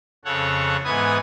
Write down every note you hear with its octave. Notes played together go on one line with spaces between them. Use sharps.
F2 C#3 A4 C#5 F#5
G#2 E3 B3 B4 G#5 D#6